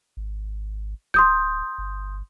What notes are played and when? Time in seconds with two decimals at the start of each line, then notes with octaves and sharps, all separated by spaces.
0.17 G#1
1.14 D1 C6 D#6 G6
1.78 G1